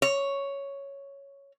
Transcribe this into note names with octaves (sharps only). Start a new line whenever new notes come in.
C#5